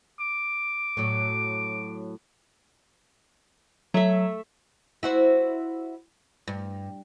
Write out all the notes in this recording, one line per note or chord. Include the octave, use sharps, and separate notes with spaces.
D6
A2 F#3
F#3 A3 E5
E4 F#4 C5
G2